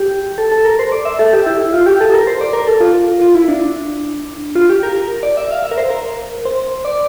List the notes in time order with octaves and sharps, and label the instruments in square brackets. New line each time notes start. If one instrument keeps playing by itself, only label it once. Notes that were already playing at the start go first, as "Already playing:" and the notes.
Already playing: [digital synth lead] G4
A4
A4
A#4
C5
D5
E5
A4
G4
E4
E4
F4
G4
A4
A#4
C5
D5
A#4
A4
F4
F4
E4
D4
F4
G4
A#4
A#4
D5
E5
F5
E5
A#4
C5
A#4
C5
D5